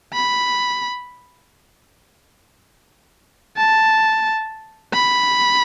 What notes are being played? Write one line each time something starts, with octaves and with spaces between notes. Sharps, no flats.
B5
A5
B5